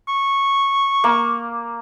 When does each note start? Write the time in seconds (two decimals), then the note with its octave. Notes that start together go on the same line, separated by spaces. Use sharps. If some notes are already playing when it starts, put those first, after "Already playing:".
0.08 C#6
1.04 A#3